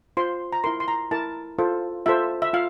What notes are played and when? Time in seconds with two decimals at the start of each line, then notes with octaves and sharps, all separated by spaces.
0.17 F4 C5 C6
0.52 A#5
0.64 E4 A#4 C6
0.80 C6
0.88 A#5
1.11 E4 A#4 A5
1.58 F4 A4 C5
2.06 F4 A4 C5 E5
2.42 E5
2.53 F4 F5